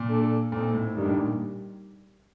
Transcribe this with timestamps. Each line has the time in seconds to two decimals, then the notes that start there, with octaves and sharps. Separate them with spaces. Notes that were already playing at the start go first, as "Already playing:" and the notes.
Already playing: A#2
0.09 D4 A4 D5
0.52 A#2 C4 D#4 A4
0.73 A2
0.95 G2 D#3 G3 D4
1.06 A2
1.17 A#2